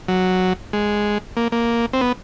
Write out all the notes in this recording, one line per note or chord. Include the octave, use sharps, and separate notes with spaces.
F#3
G#3
A#3
A#3
C4
B3